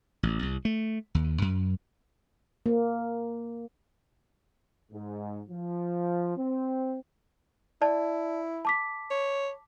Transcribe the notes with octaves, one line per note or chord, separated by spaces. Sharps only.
A1
C2
A3
D#2
F#2
A#3
G#2
F3
C4
E4 D5 A5
A5 D6 B6
C#5